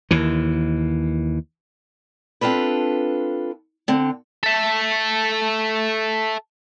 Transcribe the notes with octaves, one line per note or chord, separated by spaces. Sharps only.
D#2 E3
C4 D4 F4 A4 B4
D3 C4
A4 E5